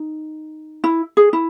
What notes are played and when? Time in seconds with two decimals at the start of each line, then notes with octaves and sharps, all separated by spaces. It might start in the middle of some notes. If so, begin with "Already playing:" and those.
Already playing: D#4
0.84 E4
1.17 G#4
1.33 E4